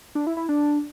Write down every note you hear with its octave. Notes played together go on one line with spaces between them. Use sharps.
D4
E4
E4
D4